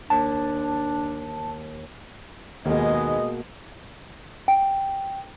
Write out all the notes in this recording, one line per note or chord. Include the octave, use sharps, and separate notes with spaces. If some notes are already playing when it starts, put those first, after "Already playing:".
D#2 D4 A5
D#2 B2 G#3 A#3 B3 G#4 D#5
G5